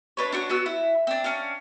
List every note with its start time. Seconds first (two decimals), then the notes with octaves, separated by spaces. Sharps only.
0.17 D4 B4 C#5
0.32 D4 F#4 B4 C#5
0.49 B3 F#4 E6
0.66 E4
1.07 C4 D4
1.24 C#4 D4 F5